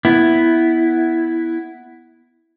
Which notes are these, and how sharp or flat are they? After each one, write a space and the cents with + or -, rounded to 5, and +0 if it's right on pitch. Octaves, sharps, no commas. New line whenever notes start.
B3 +0 E4 +0